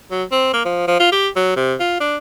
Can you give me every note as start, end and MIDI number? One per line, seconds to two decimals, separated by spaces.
0.11 0.24 54
0.32 0.53 60
0.53 0.62 58
0.65 0.84 53
0.88 0.97 53
1.00 1.12 65
1.12 1.28 67
1.36 1.52 54
1.56 1.74 48
1.80 1.98 65
2.00 2.17 62